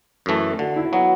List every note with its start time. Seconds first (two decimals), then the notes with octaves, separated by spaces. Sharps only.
0.26 F#2 E3 A3
0.59 D3 F#4
0.76 E4
0.92 F#3 B3 F#4